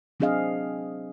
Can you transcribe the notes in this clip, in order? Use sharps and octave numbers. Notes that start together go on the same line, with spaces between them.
F#3 C4 D4 G#4 D#5 F5